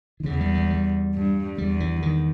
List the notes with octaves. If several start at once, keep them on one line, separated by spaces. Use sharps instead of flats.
D#3
E2 C#3
G3
G3
G3
G2
E2 G3
E3
D#3